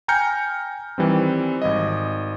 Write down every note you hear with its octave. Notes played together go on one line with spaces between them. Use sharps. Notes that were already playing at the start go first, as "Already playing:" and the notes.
G5 G#5 A#5 F6 G6 C#7
D#3 E3 G3 C4
G#1 D#5